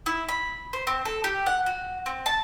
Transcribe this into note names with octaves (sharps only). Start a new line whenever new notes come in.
E4
B5
C5
C4
A4
G4
F#5
F#4
C4
A5